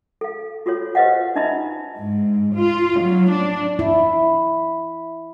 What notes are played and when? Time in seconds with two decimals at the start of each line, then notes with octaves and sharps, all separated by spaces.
0.21 A4 F5
0.66 F4 F#4 A4 C#5
0.95 G4 B4 C5 D#5 F5 F#5
1.36 D4 D#4 D#5 E5 A#5 B5
1.98 G#2
2.55 F4
3.02 F#3
3.32 D4
3.79 E4